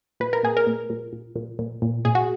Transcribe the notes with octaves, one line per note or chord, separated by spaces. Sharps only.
A#2 B4
A#4
A#2 G#4
A#4
A#2
A#2
A#2
A#2
A#2
A#2
A#2 G#4
F#4